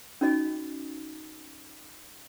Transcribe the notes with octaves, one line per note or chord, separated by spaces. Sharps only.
C#4 D#4 F#4 D#5